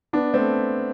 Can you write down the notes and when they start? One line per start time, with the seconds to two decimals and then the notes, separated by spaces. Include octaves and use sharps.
0.13 B3 D4
0.34 A3 C4